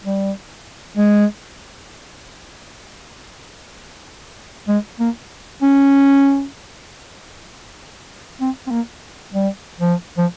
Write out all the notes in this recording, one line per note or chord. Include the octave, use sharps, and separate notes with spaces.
G3
G#3
G#3
A#3
C#4
C4
C4
A#3
G3
F3
F3